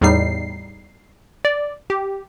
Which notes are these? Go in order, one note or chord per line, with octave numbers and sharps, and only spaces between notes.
E2 A2 G3 D#4 C7
D5
G4